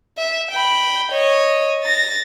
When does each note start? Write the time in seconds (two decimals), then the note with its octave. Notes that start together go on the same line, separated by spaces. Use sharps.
0.18 E5
0.51 G5 B5
1.12 C#5 D#5
1.84 A6 A#6